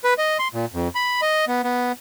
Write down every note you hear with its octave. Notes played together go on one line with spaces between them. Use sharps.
B4
D#5
C6
A#2
F2
B5
D#5
B3
B3